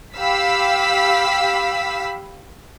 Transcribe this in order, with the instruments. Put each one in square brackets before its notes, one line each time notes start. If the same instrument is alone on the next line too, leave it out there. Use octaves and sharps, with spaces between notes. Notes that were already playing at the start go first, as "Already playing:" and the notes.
[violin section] G4 F5 B5 E6 B6